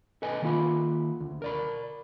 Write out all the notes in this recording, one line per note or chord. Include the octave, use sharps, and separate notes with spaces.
A4 B4 D#5 G#5
D#3 A#3 F4 B5
D2
A#4 D5 B5